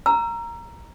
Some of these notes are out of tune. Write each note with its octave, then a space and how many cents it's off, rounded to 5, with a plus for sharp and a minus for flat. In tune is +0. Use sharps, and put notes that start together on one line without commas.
A#5 +0 E6 +40